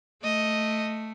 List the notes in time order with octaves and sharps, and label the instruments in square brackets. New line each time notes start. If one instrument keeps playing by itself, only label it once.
[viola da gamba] A3 [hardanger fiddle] D#5